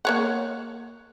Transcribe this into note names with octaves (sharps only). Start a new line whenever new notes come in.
A#3 C#5 F#5